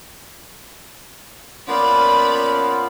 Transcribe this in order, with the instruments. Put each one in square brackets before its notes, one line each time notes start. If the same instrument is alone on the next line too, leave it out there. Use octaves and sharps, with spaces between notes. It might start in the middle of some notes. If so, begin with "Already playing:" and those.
[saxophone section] F3 A#3 C#4 [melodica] B3 F4 [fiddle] D5 B5